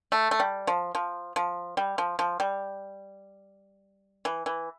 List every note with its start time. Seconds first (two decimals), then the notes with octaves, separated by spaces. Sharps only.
0.12 A3
0.31 A3
0.40 G3
0.67 F3
0.95 F3
1.36 F3
1.77 G3
1.98 F3
2.19 F3
2.40 G3
4.25 E3
4.46 E3